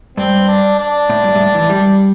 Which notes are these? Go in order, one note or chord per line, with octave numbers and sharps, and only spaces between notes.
G2 C4
D4
D4
A2
G2
G2
A2
E3
G3